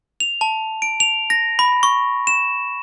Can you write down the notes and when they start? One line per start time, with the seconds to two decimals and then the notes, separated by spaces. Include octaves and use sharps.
0.20 F7
0.41 A5
0.82 D7
1.00 F7
1.30 A#6
1.59 B5
1.83 C#6
2.27 E7